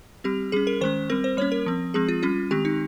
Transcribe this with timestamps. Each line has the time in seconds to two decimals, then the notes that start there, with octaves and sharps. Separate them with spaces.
0.24 G3 C4 G4
0.52 G3 C#4 G#4
0.67 A#4
0.81 D#3 G#3 C#4 C5
1.10 G3 C4 A#4
1.24 C5
1.37 G3 A#3 C#4 C#5
1.52 A#4
1.66 F3 C4
1.94 F3 G#3 C4 G#4
2.08 F4
2.23 G3 C#4 F4
2.51 D#3 G#3 C4 G4
2.65 D#4